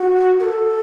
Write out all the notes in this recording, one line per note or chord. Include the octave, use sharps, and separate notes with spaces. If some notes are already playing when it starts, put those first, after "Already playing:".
Already playing: F#4
A#4
A4